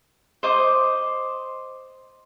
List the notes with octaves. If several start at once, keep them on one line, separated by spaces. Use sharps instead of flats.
C5 D#5 D6